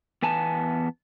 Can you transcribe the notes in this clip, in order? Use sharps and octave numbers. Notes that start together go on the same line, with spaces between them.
E2 B3 G#5 A5